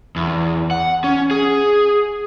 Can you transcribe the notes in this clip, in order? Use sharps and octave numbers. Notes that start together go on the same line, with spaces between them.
E2
F#5
C#4
G#4